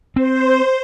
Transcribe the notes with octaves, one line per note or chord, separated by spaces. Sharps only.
C4 C5